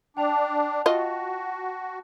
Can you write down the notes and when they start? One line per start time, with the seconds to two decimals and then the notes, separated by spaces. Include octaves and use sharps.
0.17 D4 G5 A5 F7
0.86 F4 F#4 D#5